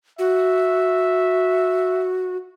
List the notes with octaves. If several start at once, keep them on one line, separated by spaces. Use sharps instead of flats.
F#4 E5